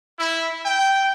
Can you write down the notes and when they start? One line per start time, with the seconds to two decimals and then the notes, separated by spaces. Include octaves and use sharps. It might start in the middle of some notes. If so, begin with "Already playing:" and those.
0.19 E4
0.64 G5